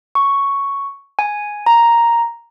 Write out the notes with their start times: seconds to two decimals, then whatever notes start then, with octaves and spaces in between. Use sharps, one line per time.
0.15 C#6
1.19 G#5
1.66 A#5